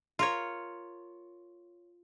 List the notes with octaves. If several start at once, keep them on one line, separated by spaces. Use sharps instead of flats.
F4 A#4 C#5